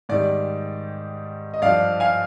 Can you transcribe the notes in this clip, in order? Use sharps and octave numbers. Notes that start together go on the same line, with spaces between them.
G#2 D#3 G3 D5
D#5
G2 F3 D5 F5
F5 G#5